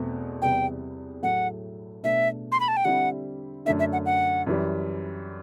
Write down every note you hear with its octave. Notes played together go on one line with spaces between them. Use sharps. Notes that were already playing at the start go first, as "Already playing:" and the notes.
Already playing: E2 B2 A3 C4
E2 C3 G3 B3 G5
A2 F#3 A3 F#5
B2 A3 D4 E5
C6
B5
A5
G5
D3 G3 C4 E4 F#5
F#2 D3 A3 D4 E5
E5
F#5
F#5
F#2 E3 G3